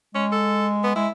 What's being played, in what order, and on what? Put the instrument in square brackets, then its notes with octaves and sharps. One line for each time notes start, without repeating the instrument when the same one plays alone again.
[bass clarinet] G#3 [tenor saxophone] C#4
[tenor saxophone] A4
B3
[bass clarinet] G#3 [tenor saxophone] E4